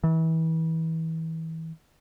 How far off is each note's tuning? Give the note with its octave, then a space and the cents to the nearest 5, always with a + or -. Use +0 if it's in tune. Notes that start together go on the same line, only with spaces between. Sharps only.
E3 -30